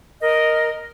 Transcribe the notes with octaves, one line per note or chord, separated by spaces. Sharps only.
A#4 D#5